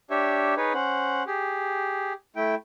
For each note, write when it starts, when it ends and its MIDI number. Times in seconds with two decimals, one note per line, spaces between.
0.11 0.55 62
0.11 0.55 67
0.11 0.55 73
0.11 0.55 76
0.57 0.73 63
0.57 0.73 68
0.57 0.73 71
0.57 0.73 73
0.74 1.23 61
0.74 1.23 72
0.74 1.23 78
1.27 2.13 67
1.27 2.13 68
2.36 2.55 57
2.36 2.55 64
2.36 2.55 79